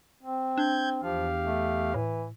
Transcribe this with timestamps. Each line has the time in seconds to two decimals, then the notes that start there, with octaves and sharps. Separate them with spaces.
0.23 C4
0.58 D4 G6 G#6
1.03 E2 F3 G4 F5
1.42 A3
1.94 A2 E3